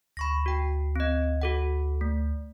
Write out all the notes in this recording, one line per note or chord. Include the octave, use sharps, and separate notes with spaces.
D2 B5 C#6 A#6
F#4 G5
C4 D#5
F#4 A4 F#5
A3